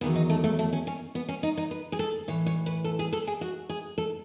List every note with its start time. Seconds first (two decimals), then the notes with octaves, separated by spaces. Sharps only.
0.01 E2 D#3 F#3 B3
0.16 D#4
0.30 A3
0.44 A3
0.59 A3
0.73 C#4
0.87 C#4
1.15 B3
1.28 C#4
1.43 D#4
1.57 D#4
1.71 B4
1.92 G#4
1.99 A4
2.28 A2 E3 C#5
2.46 C#5
2.66 B4
2.84 A4
2.99 G#4
3.13 A4
3.27 G#4
3.41 F#4
3.69 G#4
3.98 A4